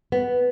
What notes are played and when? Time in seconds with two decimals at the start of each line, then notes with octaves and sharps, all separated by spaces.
0.12 B3